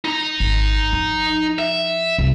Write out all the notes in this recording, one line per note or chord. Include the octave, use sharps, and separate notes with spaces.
D#4 A#5
G#1
F3
E5
C2